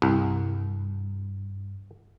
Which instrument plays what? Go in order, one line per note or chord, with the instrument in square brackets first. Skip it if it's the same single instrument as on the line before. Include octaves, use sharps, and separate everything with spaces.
[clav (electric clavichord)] C2 [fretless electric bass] G2